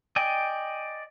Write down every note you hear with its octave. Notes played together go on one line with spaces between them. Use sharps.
D5 D#5 G5 G#5